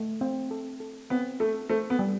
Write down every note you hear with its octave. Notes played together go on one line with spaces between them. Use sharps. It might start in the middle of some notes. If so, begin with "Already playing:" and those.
Already playing: A3
C4
A4
A4
B3 C4
A3 A4
A3 C5
B3
G3